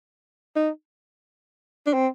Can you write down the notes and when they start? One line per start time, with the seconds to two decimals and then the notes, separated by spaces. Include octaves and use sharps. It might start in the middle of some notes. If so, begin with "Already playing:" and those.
0.56 D#4
1.87 D4
1.94 C4